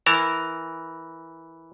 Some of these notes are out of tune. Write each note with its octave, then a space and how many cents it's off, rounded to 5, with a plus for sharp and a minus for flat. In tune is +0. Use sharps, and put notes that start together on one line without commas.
E3 -5 A#4 -5 A5 +40